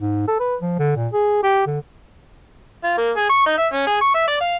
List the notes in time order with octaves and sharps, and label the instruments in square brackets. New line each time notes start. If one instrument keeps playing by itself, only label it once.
[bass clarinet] G#2
A4
B4
F3
D3
A#2
G#4
G4
D3
[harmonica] F4
A#3
G#4
C#6
D#4
E5
C#4
G#4
C#6
E5
D5
F5